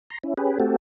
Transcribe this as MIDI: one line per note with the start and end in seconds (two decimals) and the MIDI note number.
0.10 0.18 82
0.10 0.18 84
0.24 0.34 61
0.24 0.34 64
0.37 0.58 61
0.37 0.58 67
0.37 0.58 68
0.37 0.58 71
0.60 0.76 57
0.60 0.76 60
0.60 0.76 66
0.60 0.76 67
0.60 0.76 69